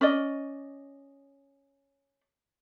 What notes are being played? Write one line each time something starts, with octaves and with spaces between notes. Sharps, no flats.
C#4 D5 D#5